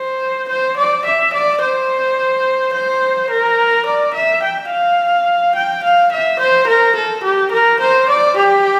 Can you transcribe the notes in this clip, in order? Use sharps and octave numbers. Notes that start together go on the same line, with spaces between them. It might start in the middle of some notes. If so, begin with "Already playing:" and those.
Already playing: C5
C5
D5
E5
D5
C5
C5
A#4
D5
E5
G5
F5
G5
F5
E5
C5
A#4
A4
G4
A#4
C5
D5
G4